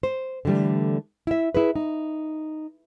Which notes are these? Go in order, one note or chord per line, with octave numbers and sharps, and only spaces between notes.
C5
D3 E3 F#3 G3 A3
E4 E5
E4 G#4 B4
D#4